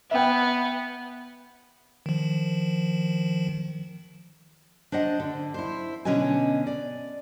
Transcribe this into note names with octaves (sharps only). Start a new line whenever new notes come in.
B3 E5 G5
D#3 F3
D4 C5 D#5 F#5
D3
E4 C5
B2 D3 C#4 B4 D#5 G#5
D5